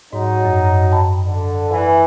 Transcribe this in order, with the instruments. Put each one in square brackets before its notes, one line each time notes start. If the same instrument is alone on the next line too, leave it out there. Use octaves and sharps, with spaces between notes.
[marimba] G#2 [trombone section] F#3 D#4
[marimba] F#2
G5 A5 B5
[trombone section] D3
E3